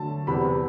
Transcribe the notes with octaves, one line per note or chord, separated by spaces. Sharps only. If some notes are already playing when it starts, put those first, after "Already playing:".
Already playing: D3 F#3 A3 A5
E2 C3 G3 B3 B5